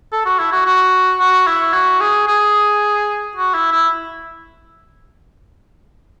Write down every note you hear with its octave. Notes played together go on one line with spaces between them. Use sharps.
A4
F#4
E4
F#4
F#4
F#4
E4
F#4
G#4
G#4
F#4
E4
E4